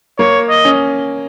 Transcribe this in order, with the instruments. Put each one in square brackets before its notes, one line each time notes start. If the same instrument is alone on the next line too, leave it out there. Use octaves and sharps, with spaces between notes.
[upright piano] A#3 [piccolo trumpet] C#5
[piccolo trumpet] D#5
[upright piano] C#4